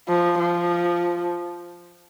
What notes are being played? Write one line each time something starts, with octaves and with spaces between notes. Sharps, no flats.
F3
F3